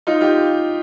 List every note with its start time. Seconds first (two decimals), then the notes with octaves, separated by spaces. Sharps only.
0.07 D#4 F4
0.21 F4 G4